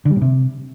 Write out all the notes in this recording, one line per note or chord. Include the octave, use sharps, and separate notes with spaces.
D3
G3
A#2
C3